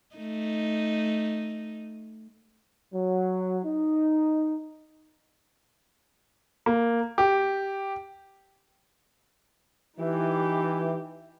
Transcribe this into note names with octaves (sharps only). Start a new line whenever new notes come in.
A3 D#4
F#3
D#4
A#3
G4
E3 D#4 G4